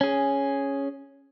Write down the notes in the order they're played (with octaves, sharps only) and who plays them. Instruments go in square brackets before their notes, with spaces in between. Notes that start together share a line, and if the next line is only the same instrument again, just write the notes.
[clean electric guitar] C#4 G#4